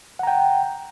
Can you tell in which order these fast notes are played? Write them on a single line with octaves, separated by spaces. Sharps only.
F#5 A#5 G5